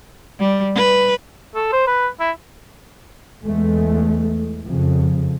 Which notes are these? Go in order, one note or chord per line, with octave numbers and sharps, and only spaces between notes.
G3
B4
A4
C5
B4
E4
E2 G#3 A3
F2 C#3